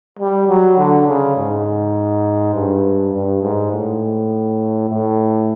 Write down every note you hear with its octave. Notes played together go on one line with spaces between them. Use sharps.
G3
F#3
D3
C#3
G#2
G2
G2
G#2
A2
A2